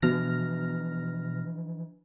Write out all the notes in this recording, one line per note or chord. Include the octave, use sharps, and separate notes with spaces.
B2 E3 F3 D4 F6 A#6